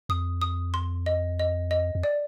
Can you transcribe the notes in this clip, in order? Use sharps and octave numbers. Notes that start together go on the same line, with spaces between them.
F2 D#6
D#6
C6
D#5
D#5
D#5
F2
D5